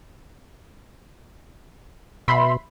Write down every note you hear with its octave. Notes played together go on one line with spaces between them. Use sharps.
B2 E5 B5 C6